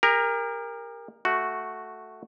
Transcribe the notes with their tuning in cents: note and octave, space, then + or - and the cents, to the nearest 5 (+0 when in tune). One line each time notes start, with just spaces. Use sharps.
G4 +45 A#4 +0
A3 +0 F#4 +0